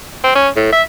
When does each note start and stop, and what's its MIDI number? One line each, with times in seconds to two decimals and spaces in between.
0.24 0.33 60
0.35 0.49 61
0.56 0.71 45
0.72 0.82 76